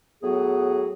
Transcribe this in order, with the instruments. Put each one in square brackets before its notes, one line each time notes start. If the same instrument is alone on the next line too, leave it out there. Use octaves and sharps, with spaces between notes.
[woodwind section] A2 F#3 B3 F#4 G#4